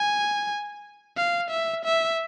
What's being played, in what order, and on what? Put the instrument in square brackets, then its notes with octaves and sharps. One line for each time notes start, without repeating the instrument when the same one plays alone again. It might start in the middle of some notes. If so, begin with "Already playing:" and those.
Already playing: [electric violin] G#5
F5
E5
E5